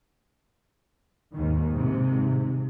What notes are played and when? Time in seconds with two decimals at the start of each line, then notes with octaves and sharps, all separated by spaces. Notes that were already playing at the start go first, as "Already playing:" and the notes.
1.33 D#2 G#2 D#3
1.71 G#2 C3